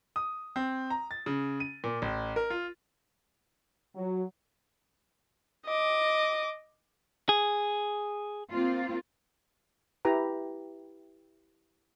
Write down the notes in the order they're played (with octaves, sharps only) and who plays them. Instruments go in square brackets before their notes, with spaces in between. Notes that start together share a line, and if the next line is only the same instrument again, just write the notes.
[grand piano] D#6
C4
A#5
A6
C#3
D#7
A#2
A1
A#4
F4
[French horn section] F#3
[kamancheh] D#5 D6
[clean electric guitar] G#4
[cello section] A#3 C4 F4
[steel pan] E4 G4 B4 A#5